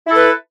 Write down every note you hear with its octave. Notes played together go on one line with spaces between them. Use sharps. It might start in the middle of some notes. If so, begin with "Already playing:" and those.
E4 A4 B4